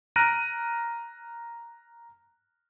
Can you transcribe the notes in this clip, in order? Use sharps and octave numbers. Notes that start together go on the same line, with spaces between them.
A#5 F6 F#6 A#6 D7 D#7